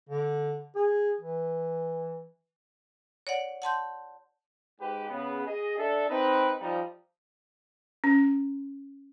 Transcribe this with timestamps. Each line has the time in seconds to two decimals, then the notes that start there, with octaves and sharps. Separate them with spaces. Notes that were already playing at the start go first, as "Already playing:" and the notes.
0.09 D3
0.76 G#4
1.21 E3
3.27 C#5 D5 F#5
3.62 F#5 A5 C6 G6
4.79 G#2 G4 B4
5.09 C#3 B3
5.46 G#4 D#5
5.77 D4 A4 E5
6.09 C4 D#4 B4
6.60 F3 G3 D#4
8.04 C#4